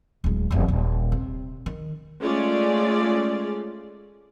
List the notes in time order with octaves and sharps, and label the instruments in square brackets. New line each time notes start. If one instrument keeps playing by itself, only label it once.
[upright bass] D1 G#3
F1 D#2
D#1
C3
D#3
[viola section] G#3 A3 C#4 F4 G#4 D5